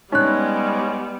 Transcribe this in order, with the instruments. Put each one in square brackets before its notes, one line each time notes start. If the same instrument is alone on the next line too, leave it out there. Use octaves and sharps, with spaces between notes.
[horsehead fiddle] G3 B3 [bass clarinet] G#3 [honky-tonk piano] C#4 [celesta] D#4 F#6